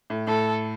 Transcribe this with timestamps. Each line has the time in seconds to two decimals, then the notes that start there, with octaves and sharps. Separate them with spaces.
0.10 A2
0.27 A2 A4